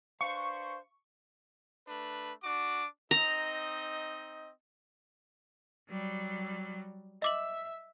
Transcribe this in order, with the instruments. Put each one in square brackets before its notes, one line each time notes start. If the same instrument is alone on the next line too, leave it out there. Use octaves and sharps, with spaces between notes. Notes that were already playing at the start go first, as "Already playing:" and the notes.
[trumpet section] D4 B4 C5 [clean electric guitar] F5 [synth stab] C#6
[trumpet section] A3 D4 B4
D4 F#4 D6
[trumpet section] C4 D#4 D#5 [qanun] A#5
[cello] F#3 G3
[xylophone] D#5 D6 F#7 [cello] E5